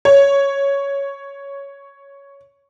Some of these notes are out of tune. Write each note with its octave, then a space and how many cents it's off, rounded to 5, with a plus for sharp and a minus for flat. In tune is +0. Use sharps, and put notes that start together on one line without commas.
C#5 +5